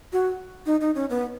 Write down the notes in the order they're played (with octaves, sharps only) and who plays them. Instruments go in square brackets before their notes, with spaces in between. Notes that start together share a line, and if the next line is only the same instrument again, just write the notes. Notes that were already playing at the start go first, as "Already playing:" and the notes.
[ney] F#4
D#4
D#4
C#4
B3